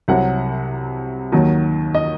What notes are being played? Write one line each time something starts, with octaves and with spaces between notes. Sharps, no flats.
C2 C3 F#3 F#5
D#2 D#3 F#3
D#5